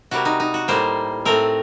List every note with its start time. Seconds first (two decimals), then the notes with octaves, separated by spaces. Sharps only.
0.11 C3 G3 A#3 F#4
0.25 D#4
0.40 D#4
0.54 F#4
0.68 A2 G3 A#3 C5
1.25 A2 A3 C4 A#4